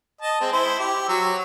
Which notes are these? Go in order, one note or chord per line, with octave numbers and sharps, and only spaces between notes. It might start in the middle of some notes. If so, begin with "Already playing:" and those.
D#5 A5
G#3 C4
E4 C5
G4
F#3 E6